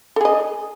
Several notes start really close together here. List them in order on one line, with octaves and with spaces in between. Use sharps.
A4 G#4 D#5